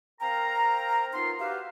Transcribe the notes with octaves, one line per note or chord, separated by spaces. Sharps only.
C4 A#4 F5 G5 A#5
B3 D#4 F4 A#4 C6
F#4 G4 B4 E5 F5